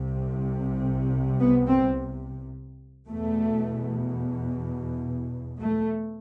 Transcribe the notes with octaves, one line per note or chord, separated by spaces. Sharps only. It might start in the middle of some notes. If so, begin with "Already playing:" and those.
Already playing: C2 C3
B3
C4
E2 B2 A3
A3